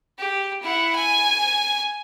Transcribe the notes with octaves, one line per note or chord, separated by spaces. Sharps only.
G4
E4 F#5
G#5